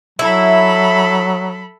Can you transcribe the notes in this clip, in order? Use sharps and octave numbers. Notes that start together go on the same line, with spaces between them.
F#3 E4 A4 B5